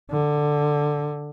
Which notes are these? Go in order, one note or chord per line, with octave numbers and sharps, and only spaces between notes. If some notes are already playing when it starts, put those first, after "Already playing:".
D3